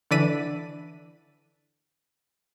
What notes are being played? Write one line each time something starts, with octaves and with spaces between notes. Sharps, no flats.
D3 E3 D5 B6 D#7